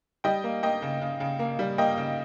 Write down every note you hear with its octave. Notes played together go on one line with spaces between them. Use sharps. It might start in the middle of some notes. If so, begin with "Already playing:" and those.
G3 D#5 G5
A#3
A#3 D#5 G5
C#3
C#3
C#3
A#3
G3
A#3 D#5 G5
C#3